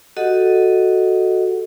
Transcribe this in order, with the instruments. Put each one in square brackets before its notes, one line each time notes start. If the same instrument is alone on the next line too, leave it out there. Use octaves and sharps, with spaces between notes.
[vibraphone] F#4 G4 A4 D#5 F#5